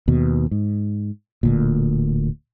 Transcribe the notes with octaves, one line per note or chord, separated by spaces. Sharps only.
D#2 B2
G#2
D1 D2 A#2